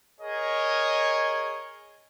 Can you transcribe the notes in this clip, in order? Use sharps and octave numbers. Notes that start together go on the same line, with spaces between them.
G#4 A#4 C#5 D#5